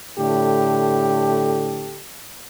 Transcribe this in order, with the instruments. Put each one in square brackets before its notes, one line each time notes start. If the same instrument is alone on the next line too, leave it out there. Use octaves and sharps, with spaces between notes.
[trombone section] A2 D3 G4 A4